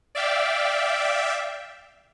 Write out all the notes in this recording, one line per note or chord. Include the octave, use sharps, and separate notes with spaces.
D5 E5 F5 G5